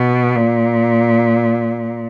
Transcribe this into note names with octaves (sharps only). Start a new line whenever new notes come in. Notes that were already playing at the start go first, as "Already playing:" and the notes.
Already playing: B2
A#2